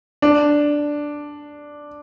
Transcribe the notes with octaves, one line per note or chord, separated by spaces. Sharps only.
D4